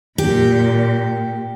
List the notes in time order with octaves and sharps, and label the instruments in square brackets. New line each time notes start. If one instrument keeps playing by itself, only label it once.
[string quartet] A#2 [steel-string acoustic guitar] G4